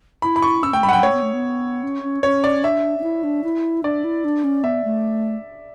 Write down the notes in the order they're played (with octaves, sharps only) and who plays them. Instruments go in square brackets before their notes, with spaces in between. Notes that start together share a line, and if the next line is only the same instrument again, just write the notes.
[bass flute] E4 [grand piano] B5
[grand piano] B5
C#6
[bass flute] C#4 [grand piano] E6
[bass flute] A3 [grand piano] G5
[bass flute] G3 [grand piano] B5
[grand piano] F#5
[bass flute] F#3 [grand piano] G5
[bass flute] A3 [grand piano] C#5
[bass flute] B3
A3
B3
C#4
C#4
[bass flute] C#4 [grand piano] C#5
[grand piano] D5
[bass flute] D4 [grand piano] E5
[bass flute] D4
E4
D4
E4
[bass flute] D4 [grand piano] D5
[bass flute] E4
D4
C#4
[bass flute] B3 [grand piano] E5
[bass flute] A3